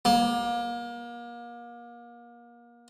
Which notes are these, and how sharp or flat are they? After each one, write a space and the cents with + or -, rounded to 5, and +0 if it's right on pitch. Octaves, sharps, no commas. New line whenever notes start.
A#3 +30